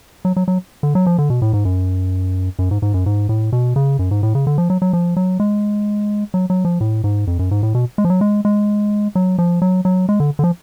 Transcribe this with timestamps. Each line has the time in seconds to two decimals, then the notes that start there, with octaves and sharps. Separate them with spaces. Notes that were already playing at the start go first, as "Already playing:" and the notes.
0.25 F#3
0.36 F#3
0.48 F#3
0.83 D3
0.95 F#3
1.06 F3
1.18 D3
1.30 B2
1.42 A2
1.53 G#2
1.65 F#2
2.59 F#2
2.71 G#2
2.82 G#2
2.94 F#2
3.06 G#2
3.29 A2
3.53 B2
3.76 C#3
3.99 F#2
4.11 G#2
4.23 A2
4.35 C#3
4.47 D3
4.58 F3
4.70 F#3
4.82 F#3
4.93 F3
5.16 F#3
5.40 G#3
6.34 F#3
6.50 F#3
6.65 F3
6.81 A2
7.04 G#2
7.27 F2
7.39 F#2
7.51 G#2
7.63 A2
7.75 B2
7.98 G#3
8.05 F3
8.10 F#3
8.21 G#3
8.45 G#3
9.15 F#3
9.38 F3
9.62 F#3
9.85 F#3
10.09 G#3
10.20 D3
10.39 D3
10.44 F3